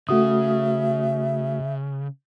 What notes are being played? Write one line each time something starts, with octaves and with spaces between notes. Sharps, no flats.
C#3 A3 F#4 E5 D#6